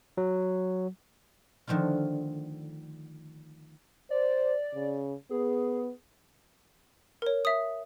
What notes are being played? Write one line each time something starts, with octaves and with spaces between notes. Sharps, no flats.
F#3
D3 D#3 F3 A3 F4
C5 D5
C#3
B3 G#4
A#4 C#5
E5 D#6